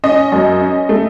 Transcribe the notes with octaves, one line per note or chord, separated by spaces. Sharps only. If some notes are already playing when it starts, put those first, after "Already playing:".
C#4 D#5
F#2
C#4
A3